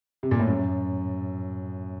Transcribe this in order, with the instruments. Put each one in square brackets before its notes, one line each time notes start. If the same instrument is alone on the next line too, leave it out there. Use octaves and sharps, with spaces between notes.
[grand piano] C3
A#2
A2
F#2